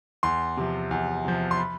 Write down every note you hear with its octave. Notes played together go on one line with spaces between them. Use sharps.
E2 C6
C3 F3
E2
C3 F3
C6
B5